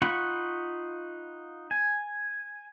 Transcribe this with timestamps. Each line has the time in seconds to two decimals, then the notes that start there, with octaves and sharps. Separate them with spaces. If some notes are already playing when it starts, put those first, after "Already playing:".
0.02 D#4 F4 F#5 B5 C#6
1.71 G#5